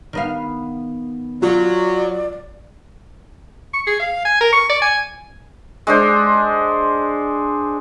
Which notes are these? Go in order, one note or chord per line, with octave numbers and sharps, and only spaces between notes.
D#3 B3 F5
F#3 F4 D5
C#6
G#4
F5
G#5
A#4
C#6
D5
G#5
G#3 D4 C5